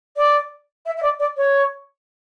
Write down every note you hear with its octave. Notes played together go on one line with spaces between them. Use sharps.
D5
E5
E5
D5
D5
C#5